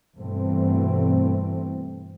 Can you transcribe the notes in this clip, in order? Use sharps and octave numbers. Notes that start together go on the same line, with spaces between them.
G2 B2 E3 A3 C4